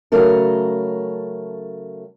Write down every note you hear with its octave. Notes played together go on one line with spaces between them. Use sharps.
C#3 F#3 A3 A4 A#4